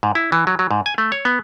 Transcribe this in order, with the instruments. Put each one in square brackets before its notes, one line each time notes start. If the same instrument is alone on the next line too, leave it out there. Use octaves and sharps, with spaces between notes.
[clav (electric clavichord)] G#2
E4
E3
F#3
F#3
G#2
G#5
A3
C#5
B3